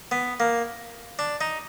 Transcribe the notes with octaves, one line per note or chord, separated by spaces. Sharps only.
B3
A#3
D4
D#4